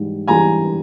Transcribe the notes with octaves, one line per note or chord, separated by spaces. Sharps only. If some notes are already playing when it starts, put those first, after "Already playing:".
Already playing: G#2 E3 G3
E3 G3 G#5 A#5